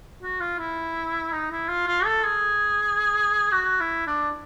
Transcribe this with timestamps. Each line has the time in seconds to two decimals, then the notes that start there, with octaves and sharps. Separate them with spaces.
0.23 F#4
0.40 F4
0.59 E4
1.33 D#4
1.52 E4
1.69 F4
1.87 F4
2.05 A4
2.24 G#4
3.52 F#4
3.80 E4
4.07 D4